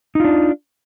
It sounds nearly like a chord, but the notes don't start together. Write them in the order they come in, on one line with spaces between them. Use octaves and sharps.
D#4 F4 D4